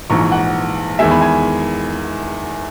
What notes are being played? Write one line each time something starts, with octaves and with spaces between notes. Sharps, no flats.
A#1 G#2 E3 A#5 C#6
F#5
E2 D#3 G#3 E5 G#5
G#5 B5
G#5 B5